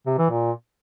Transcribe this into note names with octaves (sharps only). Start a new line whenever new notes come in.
C3
E3
A#2